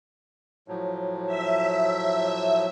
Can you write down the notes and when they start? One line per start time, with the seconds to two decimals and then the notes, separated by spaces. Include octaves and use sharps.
0.68 A2 F3 F#3
1.27 E5